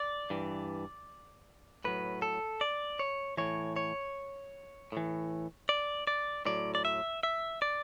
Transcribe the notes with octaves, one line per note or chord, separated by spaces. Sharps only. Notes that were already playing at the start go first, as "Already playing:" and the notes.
Already playing: D5
G2 E3
A2 F#3 B4
A4
D5
C#5
A2 E3 C#5
C#5
A2 E3
D5
D5
A2 F#3 D5
D5
E5
E5
D5